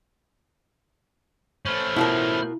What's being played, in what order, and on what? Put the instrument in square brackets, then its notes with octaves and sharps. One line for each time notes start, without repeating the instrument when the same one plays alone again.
[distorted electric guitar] A3 C#4 [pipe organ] C5 B5 F6
[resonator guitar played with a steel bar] B2 F4 A#4 [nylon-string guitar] E4